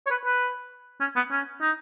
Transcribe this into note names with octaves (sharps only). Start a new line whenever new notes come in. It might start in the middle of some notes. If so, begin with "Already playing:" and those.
C#5
B4
B4
C#4
B3
C#4
D#4